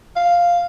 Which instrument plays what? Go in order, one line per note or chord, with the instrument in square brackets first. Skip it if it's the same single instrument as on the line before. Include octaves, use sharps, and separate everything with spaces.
[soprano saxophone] F5